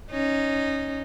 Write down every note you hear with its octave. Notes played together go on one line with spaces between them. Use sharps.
C#4 D#4